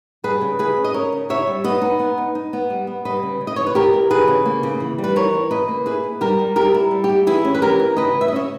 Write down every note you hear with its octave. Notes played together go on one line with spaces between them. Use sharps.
G3 G#4 B4
C#3
E4 G#4 B4
C#4
D#5
C#4 A#4 C#5
C#3
E4 C#5 E5
G3
B3 B4 D#5
D#4
B3
D#4
D#4
B3
G3
B3
G3 B4 D#5
C#3
C#3
D#5
E3 C#5
B4
E3 G4 A#4
E3
E3 G#4 B4
C#3
A#3
C#3
E3
G3
B4
E3 A#4 C#5
E3
C#3 B4 D#5
A#3
E4 G#4 B4
E4
G3 G4 A#4
G3
G3 G4 A#4
E4
G3
G4
E4
E3 E4 G#4
C#4
B4
E3 G4 A#4
E3
C#3 B4 D#5
C#3
E5
D#5
C#4 C#5 E5